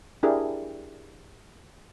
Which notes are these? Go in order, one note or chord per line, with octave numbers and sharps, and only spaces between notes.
D4 E4 G4 G#4 A#4